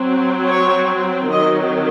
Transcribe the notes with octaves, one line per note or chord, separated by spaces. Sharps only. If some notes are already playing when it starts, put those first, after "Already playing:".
Already playing: F#3 C4
C#5
D#3 F#3 C4 D#5